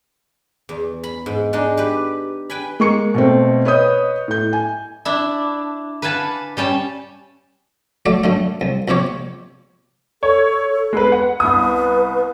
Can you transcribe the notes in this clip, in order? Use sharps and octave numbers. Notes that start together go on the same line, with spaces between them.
E2
B5
G#2
G#3 D4 D#4
G4 B4
B4 G5 G#5 B5
G#3 A#3 C#6 C#7
B2 A3 C4
B4 C#5 D#5 D#6 G6
A2 G6
G#5
D4 E4
B4 F5 F#5 G#5 A5
G3 C#4 G5 A5
F#3 A3 D5
F#2 D3 A3
C2
A#1 C3 C4 G4 C#5
A4 C#5
G#3 B3 B4
F#5
C2 B3 B4 D#6